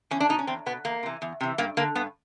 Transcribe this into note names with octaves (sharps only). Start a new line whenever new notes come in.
E2 C#4
D4
B2 D#4
C#4
E2 C4
B2 B3
E2 A#3
C3 E3
E2
C3 E3
G2 A#3
D3 A#3
G2 B3